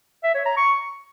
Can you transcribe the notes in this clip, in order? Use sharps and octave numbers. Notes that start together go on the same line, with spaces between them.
E5
C#5
A#5
C#6